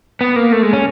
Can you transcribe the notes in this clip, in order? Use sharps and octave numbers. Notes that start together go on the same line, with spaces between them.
B3
A#3
A3
G#3
C#4